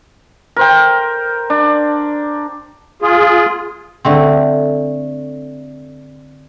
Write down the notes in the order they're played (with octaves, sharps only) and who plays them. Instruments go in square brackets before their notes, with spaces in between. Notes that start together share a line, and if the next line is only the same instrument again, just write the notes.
[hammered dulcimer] A#4 C5 G5
D4
[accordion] F4 G#4
[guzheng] D3 A3 C4